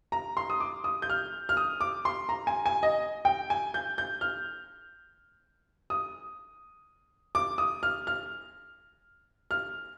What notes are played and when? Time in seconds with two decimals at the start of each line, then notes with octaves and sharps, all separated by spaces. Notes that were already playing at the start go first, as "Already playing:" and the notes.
0.12 A#5
0.37 C6
0.50 D#6
0.60 D6
0.84 D#6
1.02 G6
1.10 F6
1.49 F6
1.57 D#6
1.81 D6
2.05 C6
2.29 A#5
2.47 G#5
2.66 G#5
2.83 D#5
3.25 G5
3.50 G#5
3.74 G6
3.98 G6
4.21 F6
5.90 D#6
7.35 D6
7.58 D#6
7.83 F6
8.07 F6
9.51 F6